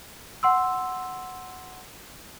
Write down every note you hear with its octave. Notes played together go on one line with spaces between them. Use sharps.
F#5 C6 E6